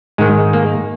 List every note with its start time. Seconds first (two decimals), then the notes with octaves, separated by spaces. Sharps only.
0.18 G#2 D#3 G#3
0.53 A#3